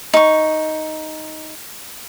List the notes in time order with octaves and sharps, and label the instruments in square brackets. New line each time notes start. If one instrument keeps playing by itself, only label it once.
[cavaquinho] D#4 C#6